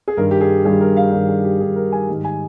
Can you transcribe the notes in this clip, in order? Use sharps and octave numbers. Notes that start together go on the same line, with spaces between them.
G#4
G2 D#3 G3 A#4
G4
G#4
G2 D#3 G3 G#4
A#4
F5
G2 D#3 G3 A#4
G#4
G4
G2 D#3 G3 G#4
A#4
G#5
G#2 D#3 G3
G#5